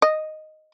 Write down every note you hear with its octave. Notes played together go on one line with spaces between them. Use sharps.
D#5